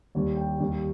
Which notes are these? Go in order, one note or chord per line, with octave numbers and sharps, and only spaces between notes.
D#2 D#3 G3
G5
D#2 D#3 G3